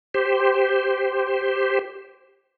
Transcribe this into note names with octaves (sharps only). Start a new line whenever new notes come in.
G4 C5